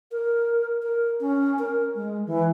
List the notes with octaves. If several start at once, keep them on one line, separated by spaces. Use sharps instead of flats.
A#4
A#4
C#4
A#4
G#3
E3